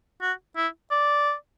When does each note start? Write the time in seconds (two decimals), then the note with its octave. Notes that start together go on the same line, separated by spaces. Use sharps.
0.22 F#4
0.57 E4
0.91 D5